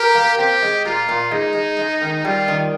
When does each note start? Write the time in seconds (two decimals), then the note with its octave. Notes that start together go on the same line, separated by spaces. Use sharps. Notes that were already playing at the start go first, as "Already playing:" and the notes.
Already playing: G4 A#4
0.15 A#3
0.38 C4 G4
0.62 G#3
0.85 A#2 F4
1.09 A#2
1.31 G#3 D#4
1.55 G#3
1.79 G#3
2.02 D#3
2.25 G3 F4
2.48 D#3